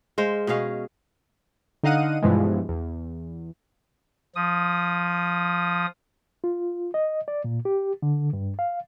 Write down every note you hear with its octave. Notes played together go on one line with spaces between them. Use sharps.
G#3 C5 F5
B2 C#4 G#4 F5
D3 D#4 D#5 F5 F#5 D#7
G2 B2 E3 F3 G#3
E2
F3 D#6
F4
D#5
D5
A#2
G4
D3
G2
F5